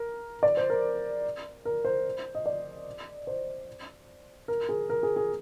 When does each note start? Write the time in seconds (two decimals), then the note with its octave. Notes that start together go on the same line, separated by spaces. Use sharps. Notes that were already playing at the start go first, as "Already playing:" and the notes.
Already playing: A#4
0.43 D5
0.57 C5
0.70 A#4
1.65 A#4
1.85 C5
2.35 D#5
2.46 D5
3.27 C5
4.48 A#4
4.69 G#4
4.90 A#4
5.03 G#4
5.16 G#4